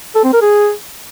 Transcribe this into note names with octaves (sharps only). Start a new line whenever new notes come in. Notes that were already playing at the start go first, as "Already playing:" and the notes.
A4
C4
A#4
G#4